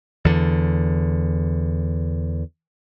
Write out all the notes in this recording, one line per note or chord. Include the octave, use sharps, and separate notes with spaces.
E2 D3